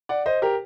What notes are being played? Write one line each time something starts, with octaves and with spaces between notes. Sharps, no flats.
D5 F#5
C5 D#5
G4 A#4